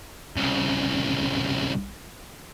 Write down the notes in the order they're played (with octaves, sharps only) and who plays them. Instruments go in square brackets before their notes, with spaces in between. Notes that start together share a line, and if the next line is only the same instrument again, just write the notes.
[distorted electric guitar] C2 C#3